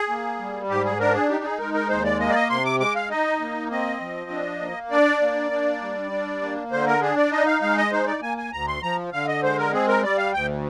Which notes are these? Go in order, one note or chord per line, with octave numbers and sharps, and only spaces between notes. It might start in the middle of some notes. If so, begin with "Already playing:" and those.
Already playing: G#4
A#3
G3
G#2 G4
G#4
D4 A#4
G#4
D#4 G4
G#4
G#3 A#4
A#4
D#2 C5
D5
A#3 D#5
D5
D#5
C3 C6
D6
G#3 D6
F5
D#4 D#5
A#3
C4 D#5
F3
D4
A#3
D4 D5
A#3
D4
G3
D4
A#3
D3 C5
A#4
D4 G#4
D5
D#4 D#5
F5
G#3 F5
D#5
D#4 C5
D5
A#3 G#5
G#5
D2 A#5
C6
F3 A#5
D3 F5
D#5
G#3 C5
A#4
C4 G#4
A#4
G3 D5
F5
D2 G5